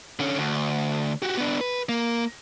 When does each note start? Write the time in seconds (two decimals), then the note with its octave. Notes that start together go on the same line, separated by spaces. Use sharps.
0.20 D3 C#4
0.39 D2
1.22 F#4 G4
1.37 B3 D4
1.61 B4
1.89 A#3